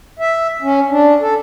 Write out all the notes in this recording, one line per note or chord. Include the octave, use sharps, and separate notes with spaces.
E5
C#4
D4
A4